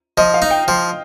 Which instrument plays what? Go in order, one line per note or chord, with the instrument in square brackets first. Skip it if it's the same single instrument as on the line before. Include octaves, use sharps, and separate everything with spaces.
[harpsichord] F3 [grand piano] D#5
[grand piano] F5
[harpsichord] D#4
[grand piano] G5
[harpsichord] F3